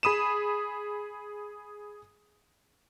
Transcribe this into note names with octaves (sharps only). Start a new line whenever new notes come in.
G#4 B5 D#6 D#7 E7